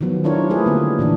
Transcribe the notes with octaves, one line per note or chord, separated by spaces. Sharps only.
D#3 F3 F#3 B3
G3 D4 E4 F4 A#4 C#5
G3 A3 E4 F4 G#4 B4
D3 A#3 B3
A#2 E3 D4